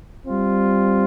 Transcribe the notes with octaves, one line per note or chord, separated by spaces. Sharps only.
G3 C4 F4